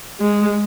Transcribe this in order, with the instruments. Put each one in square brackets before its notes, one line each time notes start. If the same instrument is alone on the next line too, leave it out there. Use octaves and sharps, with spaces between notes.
[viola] G#3